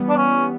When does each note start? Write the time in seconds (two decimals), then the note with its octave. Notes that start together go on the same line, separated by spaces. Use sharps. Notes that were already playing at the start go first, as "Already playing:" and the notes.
Already playing: E3 G3 B3
0.09 D4
0.17 C#4